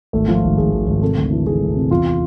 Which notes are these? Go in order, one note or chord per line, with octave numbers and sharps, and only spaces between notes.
G#1 A3
F3
F4
G#1
G#1 G#4
G#1
G#1
C3 A4
D2
E3
E3 G#4
D2
C3
E2 F4